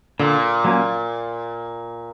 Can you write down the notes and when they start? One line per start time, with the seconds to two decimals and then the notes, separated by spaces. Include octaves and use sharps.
0.19 A#2 D3
0.64 F#3 A#3 C#4